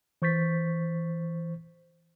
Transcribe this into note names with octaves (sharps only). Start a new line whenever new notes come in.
E3 C5 C#6 G6 A6 B6